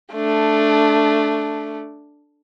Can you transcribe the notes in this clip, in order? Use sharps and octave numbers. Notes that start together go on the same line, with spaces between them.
A3 D4